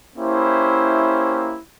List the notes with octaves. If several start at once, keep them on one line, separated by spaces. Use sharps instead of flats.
A#3 C#4 E4 G4 C5